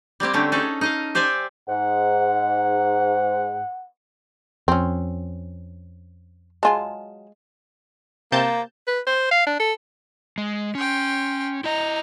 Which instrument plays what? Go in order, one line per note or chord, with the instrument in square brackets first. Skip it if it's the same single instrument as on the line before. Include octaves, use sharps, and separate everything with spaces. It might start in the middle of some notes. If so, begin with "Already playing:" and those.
[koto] G3 A#3 C4 G4
D3 A3 C4 C#4
C#4 D#4 G#4 A4
D#4 D#5 F5
G4 C5 D5 E5 G#5
[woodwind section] G#2 [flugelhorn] F#5
[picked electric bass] F2 [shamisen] C4 C#4
[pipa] F#3 G#5 A5 [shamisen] G#3 F4
[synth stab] C3 A5 G6 [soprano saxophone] A#3
[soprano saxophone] B4
C5
F5
D4
A4
[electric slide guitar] G#3
[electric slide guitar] C#4 [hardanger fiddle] G5 C6
[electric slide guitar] E4 D#5 [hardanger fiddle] A#5